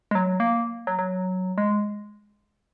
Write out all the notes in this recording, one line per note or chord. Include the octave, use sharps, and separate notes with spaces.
G#3
F#3
A#3
F#3
F#3
G#3